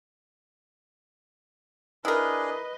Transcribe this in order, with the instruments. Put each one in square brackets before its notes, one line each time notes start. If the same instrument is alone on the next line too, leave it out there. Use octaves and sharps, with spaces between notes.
[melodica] D4 G#4 [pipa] E4 A#4 [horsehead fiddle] B4 D#5